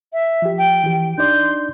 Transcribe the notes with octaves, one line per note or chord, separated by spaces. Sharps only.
E5
F3 G4
G5
E3 G4
D4 D#4 D5 C6 G6